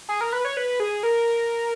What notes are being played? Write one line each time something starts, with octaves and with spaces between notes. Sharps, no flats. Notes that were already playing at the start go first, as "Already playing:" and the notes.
G#4
A#4
B4
C#5
B4
G#4
A#4